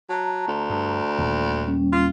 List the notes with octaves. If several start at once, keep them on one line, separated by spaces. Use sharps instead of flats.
F#3 A5 A#5
D2
G2
D#1 D#2
G3 C#4
F4